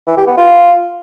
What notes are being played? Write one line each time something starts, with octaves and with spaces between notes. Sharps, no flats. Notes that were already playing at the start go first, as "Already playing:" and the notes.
E3
G4
B3
F4